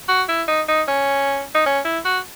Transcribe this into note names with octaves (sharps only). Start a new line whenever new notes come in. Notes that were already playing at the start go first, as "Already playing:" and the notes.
F#4
E4
D#4
D#4
C#4
D#4
C#4
E4
F#4